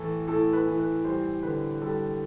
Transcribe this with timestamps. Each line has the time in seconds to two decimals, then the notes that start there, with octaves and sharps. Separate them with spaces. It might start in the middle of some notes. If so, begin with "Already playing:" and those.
Already playing: A2 E3 A4
0.27 A2 A4
0.53 B4
0.66 E3
0.80 B4
1.05 G3 C5
1.43 D3 B4
1.81 G3 A4